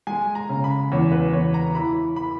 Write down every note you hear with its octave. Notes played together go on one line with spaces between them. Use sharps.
G#3 G#5
A#5
C#3
B5
E2 C#5
B4
E2 C#5
A#5
E3 B5
B5